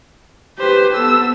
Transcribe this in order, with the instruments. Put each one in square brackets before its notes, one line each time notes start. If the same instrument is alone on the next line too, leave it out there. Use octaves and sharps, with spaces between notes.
[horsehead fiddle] G4 B4 [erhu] C5
[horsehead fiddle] B3 A4 [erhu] E6